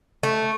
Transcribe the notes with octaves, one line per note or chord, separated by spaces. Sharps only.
A3